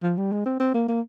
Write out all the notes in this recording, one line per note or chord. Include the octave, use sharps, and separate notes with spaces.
F3
G3
G#3
C4
C4
A#3
A#3